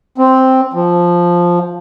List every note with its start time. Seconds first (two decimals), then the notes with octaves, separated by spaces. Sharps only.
0.18 C4
0.74 F3